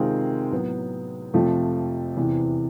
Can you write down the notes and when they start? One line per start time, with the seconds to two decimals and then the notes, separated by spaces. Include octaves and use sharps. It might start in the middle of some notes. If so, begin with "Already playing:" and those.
Already playing: C3 D#3 G#3 C4 F4
0.52 A2 F#3 B3
1.34 F2 C3 F3 A3
2.16 E2 C3 E3